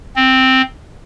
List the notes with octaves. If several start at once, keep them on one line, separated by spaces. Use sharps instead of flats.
C4